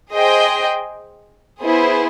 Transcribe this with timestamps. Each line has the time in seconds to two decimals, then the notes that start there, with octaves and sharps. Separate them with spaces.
0.12 G#4 C5 D#5 G5
1.62 B3 E4 G#4 C5